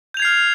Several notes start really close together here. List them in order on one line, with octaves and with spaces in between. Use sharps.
G6 F7 G#6 C7 F6